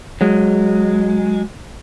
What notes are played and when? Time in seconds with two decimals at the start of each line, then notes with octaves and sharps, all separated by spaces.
0.21 F#3 G#3